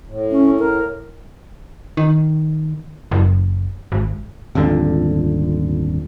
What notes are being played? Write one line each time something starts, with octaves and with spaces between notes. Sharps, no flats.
A2
C#4
A#4
D#3
F#1
G#1
D#1 G#1 F2 D3